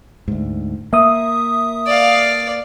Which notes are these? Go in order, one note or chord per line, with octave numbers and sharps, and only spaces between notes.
D2 G#2
A#3 E5 D#6
D5 F5